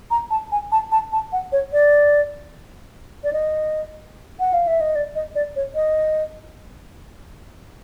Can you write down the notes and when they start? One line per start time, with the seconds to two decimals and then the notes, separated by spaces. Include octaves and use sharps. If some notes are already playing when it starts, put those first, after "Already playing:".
0.11 A#5
0.31 A5
0.52 G#5
0.72 A5
0.92 A5
1.12 A5
1.33 F#5
1.52 C#5
1.73 D5
3.24 D5
3.33 D#5
4.40 F#5
4.53 F5
4.67 E5
4.81 D#5
4.95 D5
5.15 D#5
5.35 D5
5.56 C#5
5.75 D#5